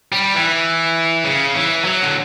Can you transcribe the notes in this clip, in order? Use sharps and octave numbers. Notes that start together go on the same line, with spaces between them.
G3
E3
C#3
E3
F#3
D3